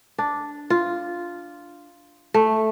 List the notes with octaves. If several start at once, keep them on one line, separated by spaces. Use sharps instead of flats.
D4
F4
A3